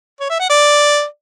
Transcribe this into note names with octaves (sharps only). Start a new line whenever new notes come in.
C#5
E5
F#5
D5